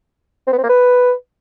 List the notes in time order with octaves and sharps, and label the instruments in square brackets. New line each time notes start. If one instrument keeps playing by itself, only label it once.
[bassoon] C4
B3
C4
A#3
B4